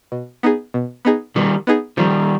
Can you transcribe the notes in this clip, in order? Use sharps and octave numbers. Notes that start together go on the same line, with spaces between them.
B2
B3 D#4 G#4
B2
B3 D#4 G#4
B2 D#3 G3
B3 D#4 G#4
D#3 F3 G3